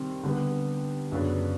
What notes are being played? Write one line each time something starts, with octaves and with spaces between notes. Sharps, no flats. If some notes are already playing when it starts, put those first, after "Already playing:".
Already playing: C3 D#3 G3 C4
D3 G3 B3
F#2 C#3 F#3 B3 D4